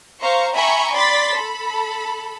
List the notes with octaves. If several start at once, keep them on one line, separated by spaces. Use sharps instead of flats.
C5 F5 A#5 C#6
E5 G5 G#5 A#5 B5 C#6
D5 B5 C6 A6 B6
A4 B5